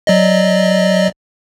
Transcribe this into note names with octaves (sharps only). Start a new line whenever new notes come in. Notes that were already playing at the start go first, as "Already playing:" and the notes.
F#3 D5 D#5